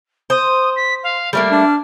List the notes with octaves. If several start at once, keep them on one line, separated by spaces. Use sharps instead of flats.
C5 D#6
B6
F5
G3 A3 A#3 F6
D4